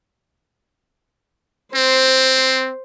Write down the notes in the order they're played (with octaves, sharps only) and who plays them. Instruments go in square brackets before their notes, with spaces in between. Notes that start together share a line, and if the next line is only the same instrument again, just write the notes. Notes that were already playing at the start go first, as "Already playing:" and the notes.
[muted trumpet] C4 [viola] C5